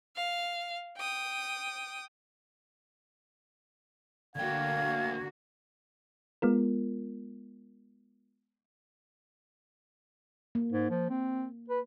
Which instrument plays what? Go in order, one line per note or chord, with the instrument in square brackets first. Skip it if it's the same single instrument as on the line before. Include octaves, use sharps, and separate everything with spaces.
[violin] F5
G5 D#6
[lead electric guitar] D2 G5 [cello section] D3 A#3 F#4 [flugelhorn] F5 [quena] G#6
[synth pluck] G#3 B3 F4 A#4
[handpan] A#3
[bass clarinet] G#2
F3
C4
B4